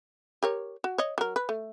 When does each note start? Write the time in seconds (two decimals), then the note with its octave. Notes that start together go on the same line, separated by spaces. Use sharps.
0.43 G4 A#4 C#5
0.84 F#4
0.98 C#5 D#5
1.18 F#3 A#4
1.36 B4
1.49 A3